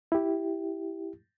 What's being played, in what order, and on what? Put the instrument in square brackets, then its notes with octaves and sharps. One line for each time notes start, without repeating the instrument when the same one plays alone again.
[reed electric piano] E4 G4